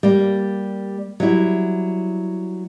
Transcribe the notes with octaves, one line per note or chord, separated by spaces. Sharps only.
G3 A#3
F#3 G3 E4